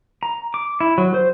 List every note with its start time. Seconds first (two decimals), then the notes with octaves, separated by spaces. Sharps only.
0.23 A#5
0.54 D6
0.80 E4
0.98 F#3
1.14 C5